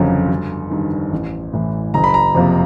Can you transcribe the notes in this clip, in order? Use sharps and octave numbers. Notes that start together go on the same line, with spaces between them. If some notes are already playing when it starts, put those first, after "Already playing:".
Already playing: G1 F2 C#3 F#3
G1
G2 D#3
A1
A2 E3
F#1 A#5
B5
A#5
F2 C3 F3 A#3